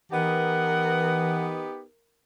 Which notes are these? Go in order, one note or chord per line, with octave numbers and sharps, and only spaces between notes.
E3 B3 D#4 G4 A#4 F#5